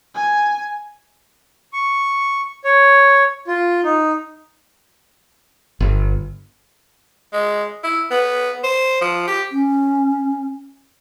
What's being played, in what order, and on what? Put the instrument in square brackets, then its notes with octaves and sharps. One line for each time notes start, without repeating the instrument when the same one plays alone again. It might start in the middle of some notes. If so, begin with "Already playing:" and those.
[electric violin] G#5
[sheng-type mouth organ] C#6
C#5
F4
D#4
[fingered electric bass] G1
[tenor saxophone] G#3
E4
B3
C5
F3
G4
[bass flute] C#4